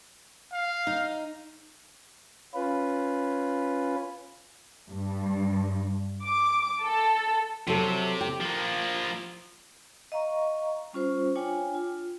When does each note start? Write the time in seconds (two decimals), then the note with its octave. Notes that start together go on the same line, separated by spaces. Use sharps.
0.52 F5
0.87 D#4
2.54 C#4 F4 B4
4.90 G2
6.25 D6
6.84 A4
7.68 C3 F#3 A4
8.21 G4
8.40 F3 A#3
10.12 D#5 F5 A#5 C#6
10.93 G3 C#4 F4 C5
11.36 D4 F4 C#5 G5 G#5
11.75 F4